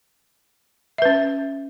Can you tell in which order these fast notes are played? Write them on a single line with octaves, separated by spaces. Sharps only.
E5 B4 C#4